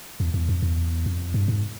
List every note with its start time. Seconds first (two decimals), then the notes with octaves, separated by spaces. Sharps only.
0.20 E2
0.34 E2
0.49 F2
0.63 E2
1.06 F2
1.34 G2
1.48 G#2